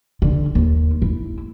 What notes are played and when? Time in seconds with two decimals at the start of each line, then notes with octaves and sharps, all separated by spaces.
0.22 D3
0.55 D#2
1.02 E4